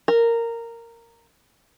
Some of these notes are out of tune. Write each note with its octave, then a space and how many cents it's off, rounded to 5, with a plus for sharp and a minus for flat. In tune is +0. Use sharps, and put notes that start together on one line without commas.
A#4 -10